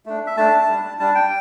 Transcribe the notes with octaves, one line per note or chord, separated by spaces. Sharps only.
A3 D4
E5
A3 D4 A5
G3 D4
G3 D4 A5
G5